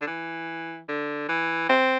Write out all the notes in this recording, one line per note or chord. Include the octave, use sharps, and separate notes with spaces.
D3
E3
D3
E3
C4